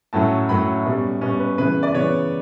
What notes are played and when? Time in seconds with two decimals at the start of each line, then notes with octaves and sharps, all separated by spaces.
0.13 A2 F#3 A3 C#4 A5
0.49 A2 F#3 A3 C#4 B5
0.85 B2 G3 C#4
1.21 B2 G3 C#4
1.40 B4
1.58 C#3 E3 B3 B4
1.83 D5
1.95 C#3 E3 B3 C#5